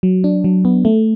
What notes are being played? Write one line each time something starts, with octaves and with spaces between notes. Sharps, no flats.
F#3
D4
F#3
B3
A3